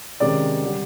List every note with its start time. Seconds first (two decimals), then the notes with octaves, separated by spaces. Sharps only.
0.20 C3 D#3 G#3 C#4 D5 D6
0.62 D3 G3